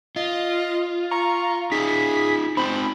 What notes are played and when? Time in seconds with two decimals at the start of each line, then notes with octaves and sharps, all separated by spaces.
0.16 F4 D#5
1.11 A#5 C#6
1.72 D#4 F4 G#4 B6
2.57 C4 D#4 C5 B5